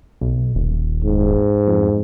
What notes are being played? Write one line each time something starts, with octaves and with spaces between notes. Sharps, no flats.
B1
D#1
G#2
F2